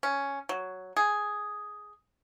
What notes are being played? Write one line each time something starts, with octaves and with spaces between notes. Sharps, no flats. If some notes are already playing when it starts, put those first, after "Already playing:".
C#4
F#3
G#4